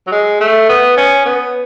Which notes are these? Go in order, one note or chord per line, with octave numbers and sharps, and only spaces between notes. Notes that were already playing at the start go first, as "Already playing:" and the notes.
F#3
G#3
A3
B3
C#4
B3